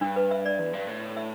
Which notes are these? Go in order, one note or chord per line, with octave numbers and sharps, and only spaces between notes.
G2 D4
B4
E5
D5
E2
G2
A2
E5